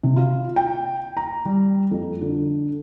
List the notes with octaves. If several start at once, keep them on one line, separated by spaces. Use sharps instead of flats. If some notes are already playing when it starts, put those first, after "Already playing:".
C3
F4
G5
A#5
G3
F2
D3